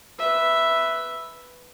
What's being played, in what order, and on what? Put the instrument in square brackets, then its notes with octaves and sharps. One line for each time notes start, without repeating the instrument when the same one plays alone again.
[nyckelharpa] B4 E5